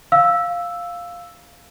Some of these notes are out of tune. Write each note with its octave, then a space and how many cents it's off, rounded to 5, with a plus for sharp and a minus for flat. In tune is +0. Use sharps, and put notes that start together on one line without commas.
F5 +0 E6 +0